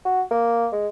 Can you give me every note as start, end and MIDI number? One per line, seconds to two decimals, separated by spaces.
0.05 0.22 66
0.31 0.67 58
0.72 0.88 56